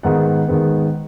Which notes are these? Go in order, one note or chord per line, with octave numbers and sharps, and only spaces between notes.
G#2 D#3 G#3 B3 F#5
G#2 D#3 G#3 B3